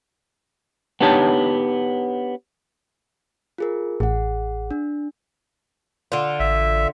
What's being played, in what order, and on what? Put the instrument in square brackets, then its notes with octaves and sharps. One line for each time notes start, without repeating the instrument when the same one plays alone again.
[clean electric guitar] B3 D4 D#4 G4 C#5 A5
[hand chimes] F4 G#4 A#4
[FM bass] A1 [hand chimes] G#4 F#5
[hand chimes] D4
[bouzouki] D3 F4
[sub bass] A1 [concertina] E5